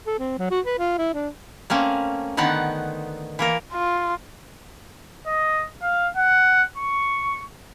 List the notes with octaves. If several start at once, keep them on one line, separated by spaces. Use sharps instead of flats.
A4
C4
F#3
F#4
B4
F4
E4
D4
A3 A#3 C4 C#4
D3 D#3 B3 D#4 F#5
E3 A#3 A#4
F4
D#5
F5
F#5
C#6